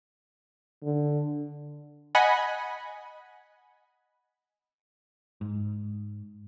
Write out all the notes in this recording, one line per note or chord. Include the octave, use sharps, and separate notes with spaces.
D3
D#5 F#5 G#5 B5
G#2